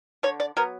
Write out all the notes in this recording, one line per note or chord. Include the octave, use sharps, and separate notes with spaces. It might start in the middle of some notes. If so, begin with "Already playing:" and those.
D3 C#5
D5
F#3 B3 A#4